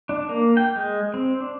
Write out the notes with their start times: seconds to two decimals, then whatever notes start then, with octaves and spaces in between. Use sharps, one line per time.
0.09 D4
0.29 A#3
0.57 G5
0.76 G#3
1.14 C4
1.40 D4